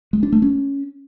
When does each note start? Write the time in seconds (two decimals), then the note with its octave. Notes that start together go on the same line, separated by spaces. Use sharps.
0.13 G#3
0.23 D4
0.32 A3
0.42 C#4